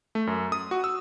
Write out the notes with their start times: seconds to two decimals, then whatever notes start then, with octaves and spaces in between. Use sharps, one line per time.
0.15 A3
0.27 F#2
0.52 D#6
0.71 F#4
0.84 E6